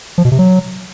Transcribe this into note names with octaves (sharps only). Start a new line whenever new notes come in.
F3
B2
C3
F#3